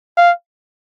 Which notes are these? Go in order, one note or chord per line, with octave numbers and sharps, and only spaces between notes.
F5